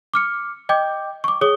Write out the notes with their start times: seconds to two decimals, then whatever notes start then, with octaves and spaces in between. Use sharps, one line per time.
0.14 D6 F6 C#7
0.69 D#5 G5 D6 G6
1.24 C#6 D6
1.41 G#4 C#5 D#6 G7